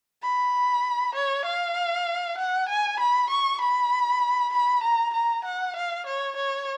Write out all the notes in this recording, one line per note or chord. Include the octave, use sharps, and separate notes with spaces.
B5
C#5
F5
F#5
G#5
B5
C#6
B5
B5
A#5
A#5
F#5
F5
C#5
C#5